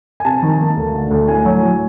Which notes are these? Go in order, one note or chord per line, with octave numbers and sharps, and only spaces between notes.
G#5
C3 A5
D#3
A#3
D2
D3
D2
A2 G#5
F#3
A2